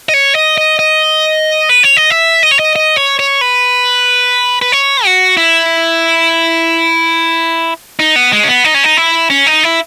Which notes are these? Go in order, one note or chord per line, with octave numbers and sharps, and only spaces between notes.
D#5
C#5
D#5
D#5
D#5
B4
C#5
D#5
E5
D#5
C#5
D#5
D#5
C#5
C#5
B4
B4
C#5
F#4
E4
D#4
B3
G#3
C#4
B3
D#4
C#4
D#4
E4
C#4
D#4
E4